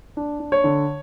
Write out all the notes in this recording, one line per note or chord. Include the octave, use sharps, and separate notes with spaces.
D4
D4
C#5
D3